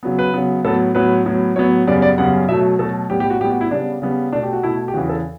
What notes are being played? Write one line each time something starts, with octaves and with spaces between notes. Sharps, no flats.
C#3 F#3 B3
B4
C#3 F#3 B3
A2 F#3 B3 A4
A2 F#3 B3 B4
A2 F#3 B3
A2 F#3 B3 C#5
F#2 C#3 G3 B3 D5
D5
F#2 C#3 G3 B3 F#5
B2 F#3 A3 E5
B2 F#3 A3 A4
A2 G3 B3 G4
G4
F#4
A2 G3 B3 G4
F#4
E4
C#3 G3 B3 D4
C#3 G3 B3
B2 A3 D4
G4
F#4
B2 A3 E4
G4
E2 C#3 E3 F#4
A4